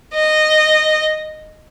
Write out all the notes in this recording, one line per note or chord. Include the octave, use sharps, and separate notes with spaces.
D#5